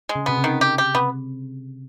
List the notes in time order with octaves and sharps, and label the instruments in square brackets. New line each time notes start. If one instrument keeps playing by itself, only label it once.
[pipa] G#3
[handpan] C#3
[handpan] C3 [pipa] B3
[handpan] C#3
[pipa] D#3
[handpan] C3 [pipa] G4
[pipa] G4
[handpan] C3 [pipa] B3